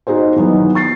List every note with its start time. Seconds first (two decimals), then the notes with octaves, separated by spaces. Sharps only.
0.07 D#4 F#4 G#4 C5
0.36 D#3 E3 F#3 B3
0.75 C#6 A6 C7